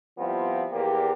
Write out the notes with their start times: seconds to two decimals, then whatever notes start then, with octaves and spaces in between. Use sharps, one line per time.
0.19 F3 G3 B3 C4 E4 F4
0.72 E2 A#3 G4